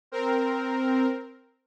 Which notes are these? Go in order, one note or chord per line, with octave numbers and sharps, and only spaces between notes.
C4 A#4